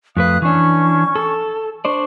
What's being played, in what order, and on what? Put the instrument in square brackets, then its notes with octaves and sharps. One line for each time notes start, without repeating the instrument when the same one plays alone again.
[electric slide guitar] F2 A3 B4 [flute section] F5 D#6 F#6
[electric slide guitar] E3 D4 [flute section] C#4 C#6
[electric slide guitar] A4
[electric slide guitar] D4 C5 D5 [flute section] C#6